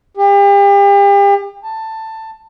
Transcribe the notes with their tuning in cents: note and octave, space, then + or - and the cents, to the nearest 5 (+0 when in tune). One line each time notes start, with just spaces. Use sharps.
G4 +40
A5 +15